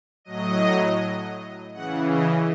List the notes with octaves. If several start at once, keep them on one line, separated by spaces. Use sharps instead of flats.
A2 F#3 D#5
C#3 E3 F#5
D#5